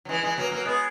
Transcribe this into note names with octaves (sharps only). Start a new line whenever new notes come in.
F#3
E3 G#3
E3 G#3
F#3 A#3
F#3 A#3
G#3 B3